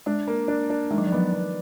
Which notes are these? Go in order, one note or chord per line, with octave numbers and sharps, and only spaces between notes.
G#3 D4
A#3
D4
D4
D#3 G#3
F#3
F3
F#3 B3
B3